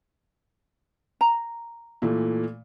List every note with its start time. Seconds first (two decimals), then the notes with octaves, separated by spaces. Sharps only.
1.21 A#5
2.02 A#2 E3 A3